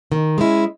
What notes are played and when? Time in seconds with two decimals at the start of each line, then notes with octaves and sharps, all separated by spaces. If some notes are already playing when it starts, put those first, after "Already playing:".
0.12 D#3
0.38 G#3 C#4 E4